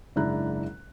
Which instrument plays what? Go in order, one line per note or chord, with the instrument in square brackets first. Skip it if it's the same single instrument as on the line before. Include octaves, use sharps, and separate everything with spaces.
[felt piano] F#1 G#2 D4 E4 A#5 F#6